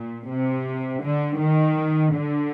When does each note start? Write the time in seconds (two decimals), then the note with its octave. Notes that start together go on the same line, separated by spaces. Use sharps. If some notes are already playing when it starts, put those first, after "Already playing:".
Already playing: A#2
0.29 C3
1.03 D3
1.39 D#3
2.14 D3